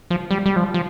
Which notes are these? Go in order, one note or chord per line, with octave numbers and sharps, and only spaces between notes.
F3
G3
G3
F3
F3